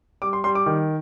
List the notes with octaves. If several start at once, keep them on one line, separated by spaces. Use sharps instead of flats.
G3 D6
C6
G3 C6
D6
D#3